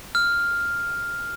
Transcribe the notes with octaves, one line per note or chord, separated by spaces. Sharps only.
F6